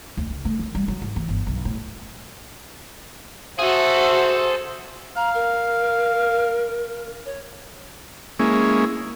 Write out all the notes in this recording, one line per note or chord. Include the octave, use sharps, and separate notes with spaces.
D2
C#2
A3
D#3
G3
F#3
G#2
E3
G1
B1
A2
F#4 G#4 A4 C5 E5
F5 A#5
A#4
C#5
G#3 A#3 C#4 E4